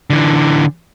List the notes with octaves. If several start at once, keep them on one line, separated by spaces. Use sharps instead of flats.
D3 E3